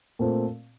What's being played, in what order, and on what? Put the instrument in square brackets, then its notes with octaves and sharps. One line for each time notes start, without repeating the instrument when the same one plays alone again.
[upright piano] A#2 A3 C4